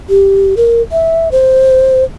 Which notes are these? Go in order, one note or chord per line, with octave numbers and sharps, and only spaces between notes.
G4
A#4
E5
C5